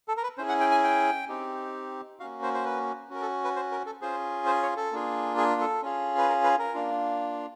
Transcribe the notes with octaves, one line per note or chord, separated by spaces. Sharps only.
A4
A#4
B4
C#4 E4 G#4 C5
F#5
G5
G#5
G5
C4 D#4 G4
A#3 C#4 F#4 F5
C5
C5
B4
C#4 F#4 A#4
A4
B4
C5
A#4
A4
C#4 F4 G#4 C5
C5
C#5
A4
A#3 D4 F4 G#4
G#4
A4
C#4 F4 G#4
B4
A#4
B4
A#4
A#3 D4 F4